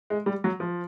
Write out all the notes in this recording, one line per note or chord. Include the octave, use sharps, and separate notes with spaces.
G#3
G3
F#3
F3